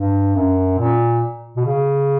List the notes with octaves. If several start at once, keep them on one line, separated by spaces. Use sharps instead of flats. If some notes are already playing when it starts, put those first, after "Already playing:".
Already playing: G2
F#2
A#2
B2
C#3